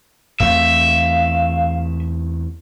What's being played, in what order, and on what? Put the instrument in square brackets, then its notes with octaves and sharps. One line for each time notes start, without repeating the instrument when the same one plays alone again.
[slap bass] E2 A3 C4 [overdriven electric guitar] E5 [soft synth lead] F5